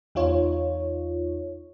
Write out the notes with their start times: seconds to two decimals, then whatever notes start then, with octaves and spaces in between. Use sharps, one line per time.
0.15 E2 D#4 F4 C#5